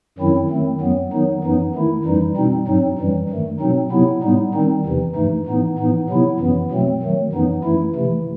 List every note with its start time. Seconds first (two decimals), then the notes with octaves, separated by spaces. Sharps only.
0.19 F#2 D#3 F#3 C4 E4
0.50 D#3 A3 C4
0.81 F#2 F#3 B3
1.12 D#3 F#3 B3 D#4
1.44 F#2 E3 B3 D#4
1.75 D#3 A3 E4
2.05 F#2 E3 G3 D#4
2.36 B2 G3 C4 D#4
2.67 G2 F#3 C4 D#4
2.99 F#2 E3 G3
3.29 G2 D#3 A3
3.60 B2 F#3 C4 D#4
3.91 C3 F#3 B3 E4
4.23 A2 G3 B3 D#4
4.54 D#3 G3 C4 D#4
4.85 E2 C3 E3
5.15 G2 E3 A3 D#4
5.46 A2 E3 B3 D#4
5.78 A2 E3 B3 D#4
6.09 C3 F#3 B3 E4
6.40 F#2 E3 B3
6.71 B2 F#3 A3 C4
7.02 D#3 F#3 A3
7.33 F#2 E3 B3 D#4
7.64 F#2 E3 A3 E4
7.95 C3 E3 A3